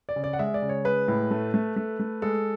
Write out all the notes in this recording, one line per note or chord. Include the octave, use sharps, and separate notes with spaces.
D5
C#3
D5
F#5
G#3 E5
D5
C#3
C#5
G#3 B4
A2
A3
A3
A3
A3
G#3 A4